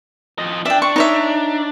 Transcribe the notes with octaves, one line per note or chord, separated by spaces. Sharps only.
F3 D#5
D4 E5 G5
C#6
D#4 C#5 E5